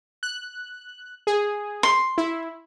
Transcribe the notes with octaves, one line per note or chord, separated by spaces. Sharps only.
F#6
G#4
C6
E4